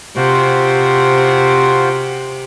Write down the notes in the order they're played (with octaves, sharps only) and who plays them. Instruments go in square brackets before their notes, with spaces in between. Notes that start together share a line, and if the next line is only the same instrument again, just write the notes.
[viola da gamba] C3 [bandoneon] F4 F#4 C5